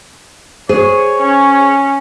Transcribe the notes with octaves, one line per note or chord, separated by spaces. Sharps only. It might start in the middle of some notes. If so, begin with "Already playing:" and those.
G#4 C5 C#5
C#4